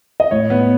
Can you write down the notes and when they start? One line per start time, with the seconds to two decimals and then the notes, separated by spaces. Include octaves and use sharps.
0.20 D#5
0.31 A2 C#5
0.50 B3